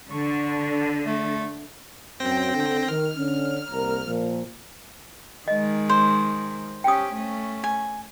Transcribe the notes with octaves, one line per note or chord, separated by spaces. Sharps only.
D3 C#6
A3
F#2 C4 G5 A#6
D3
D#3 F6
D3 C#4
C2 A#3 A#5
A#2 F3
D#3 G#3 D#5
C5
C#4 G4 G5 D#6
A3 C#4
G#5